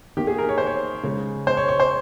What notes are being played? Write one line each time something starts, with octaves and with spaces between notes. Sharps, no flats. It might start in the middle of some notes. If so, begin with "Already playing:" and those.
D#3 A#3 G4
G#4
A#4
C#5
C5
C#5
C#3 G#3
C5
C#5
C#5
C5